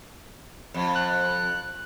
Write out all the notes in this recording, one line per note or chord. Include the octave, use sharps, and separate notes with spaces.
F2
F#6